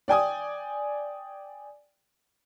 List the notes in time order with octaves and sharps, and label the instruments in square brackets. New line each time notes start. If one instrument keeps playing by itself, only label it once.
[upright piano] D5 G5 G#5 D#6